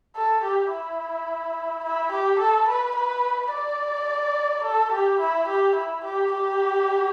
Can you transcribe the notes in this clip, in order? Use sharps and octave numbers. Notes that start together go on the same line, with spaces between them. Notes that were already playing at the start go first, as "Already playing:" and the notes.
A4
G4
E4
E4
G4
A4
B4
B4
D5
A4
G4
E4
G4
E4
G4
G4